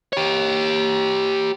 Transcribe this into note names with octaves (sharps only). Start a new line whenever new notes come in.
G4 C#5